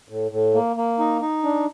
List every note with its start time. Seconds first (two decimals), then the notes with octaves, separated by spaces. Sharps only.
0.09 A2
0.31 A2
0.54 A#3
0.76 A#3
0.99 D#4
1.21 D#4
1.44 D4